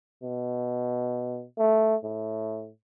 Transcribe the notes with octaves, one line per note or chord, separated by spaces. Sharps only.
B2
A3
A2